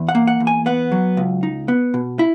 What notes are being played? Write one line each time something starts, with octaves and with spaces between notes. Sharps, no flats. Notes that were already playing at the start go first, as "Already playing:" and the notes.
Already playing: E2
F#5
A#3
F#5
E2
G#5
B3 F#5
F#3
C#2
D#4
B3
B2
E4